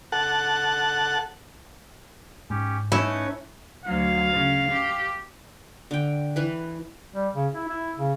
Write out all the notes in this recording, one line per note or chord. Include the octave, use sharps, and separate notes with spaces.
A4 F#5
G#2 C#4 G4
A3 C#4 D#4 E4 B4
D2 F#3 F5
C#3
G4
D3 G5
E3 B4
G3
C#3
E4
E4
C#3